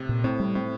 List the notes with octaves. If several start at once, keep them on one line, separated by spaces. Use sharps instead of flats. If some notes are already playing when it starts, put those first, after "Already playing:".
Already playing: A2 C3
A#2
A2 C4
G3
A2 C4